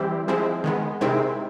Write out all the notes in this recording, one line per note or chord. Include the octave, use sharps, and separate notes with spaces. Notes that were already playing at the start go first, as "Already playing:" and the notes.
Already playing: E3 G3 C4 E4 G4
F3 G#3 C4 E4
D#3 G#3 B3
C3 D#3 G#3 C4 E4